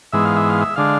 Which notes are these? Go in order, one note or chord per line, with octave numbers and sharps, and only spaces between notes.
G#2 E3 G#3 B3 E5
F5
E5
F5
E5
D3 G#3 D4 F5